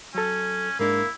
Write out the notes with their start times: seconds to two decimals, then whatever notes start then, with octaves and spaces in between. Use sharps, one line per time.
0.15 F#3 C#4 A4
0.80 G#2 G#3 A#3 D4 E4